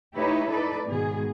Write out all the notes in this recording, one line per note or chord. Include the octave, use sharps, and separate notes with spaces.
A3 D#4 E4 G4 B4 C#5
D#4 A4 B4 D5
G#2 B2 D#3 G#4